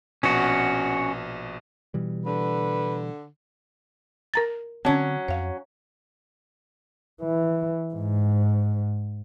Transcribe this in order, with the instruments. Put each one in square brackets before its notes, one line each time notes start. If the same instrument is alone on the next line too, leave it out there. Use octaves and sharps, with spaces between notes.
[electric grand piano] A#1 B2 [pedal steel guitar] C#4 F#4
[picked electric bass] B2 E3 G3
[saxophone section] D3 [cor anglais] B4
[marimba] A#4 A#5 A6
[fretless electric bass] D3 C4 [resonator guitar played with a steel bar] F#3 C#4 [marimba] A5
[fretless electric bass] F2 [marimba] C#5 F5
[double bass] E3
G#2